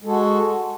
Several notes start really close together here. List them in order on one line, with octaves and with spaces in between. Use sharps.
G#3 A4 F#4